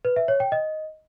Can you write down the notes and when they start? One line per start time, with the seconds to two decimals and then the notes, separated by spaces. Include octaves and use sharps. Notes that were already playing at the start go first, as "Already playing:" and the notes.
0.05 B4
0.16 E5
0.28 C#5
0.40 G5
0.52 D#5